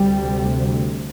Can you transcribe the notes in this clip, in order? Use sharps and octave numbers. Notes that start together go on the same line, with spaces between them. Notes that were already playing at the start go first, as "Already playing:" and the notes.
Already playing: D2 C3 G3